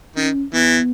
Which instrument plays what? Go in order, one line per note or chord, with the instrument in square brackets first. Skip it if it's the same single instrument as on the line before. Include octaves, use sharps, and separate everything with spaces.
[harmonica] D#3 [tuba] C#4
[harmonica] E3 [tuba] B3